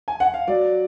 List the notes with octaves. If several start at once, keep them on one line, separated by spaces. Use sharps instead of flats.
G#5
F#5
F5
F#3 D5